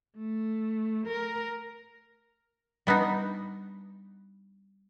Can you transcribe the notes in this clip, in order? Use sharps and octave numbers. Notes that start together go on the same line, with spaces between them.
A3
A#4
G3 B3 D4 D#4